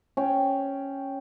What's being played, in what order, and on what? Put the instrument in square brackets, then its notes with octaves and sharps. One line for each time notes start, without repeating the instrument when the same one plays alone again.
[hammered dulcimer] C#4 G5